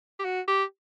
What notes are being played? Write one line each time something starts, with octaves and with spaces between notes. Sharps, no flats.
G4
F#4
G4